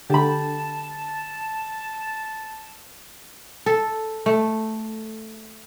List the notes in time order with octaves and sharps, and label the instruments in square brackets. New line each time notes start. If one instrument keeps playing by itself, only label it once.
[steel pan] D3 [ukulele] G4 B5 [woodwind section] A5
[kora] A4
A3